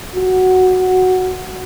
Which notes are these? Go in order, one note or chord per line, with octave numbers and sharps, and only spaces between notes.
F#4